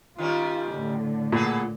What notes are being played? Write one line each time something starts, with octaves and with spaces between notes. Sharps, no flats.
D#3 G3 C#4 F4
A2 D3
A#2 B3 G#4 A4